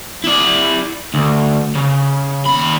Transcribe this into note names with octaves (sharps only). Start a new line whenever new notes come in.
E4 D5
D2
C#3
D#2 B5